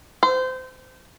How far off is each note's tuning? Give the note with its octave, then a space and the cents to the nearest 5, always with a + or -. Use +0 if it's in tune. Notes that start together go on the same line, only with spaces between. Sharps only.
C5 -25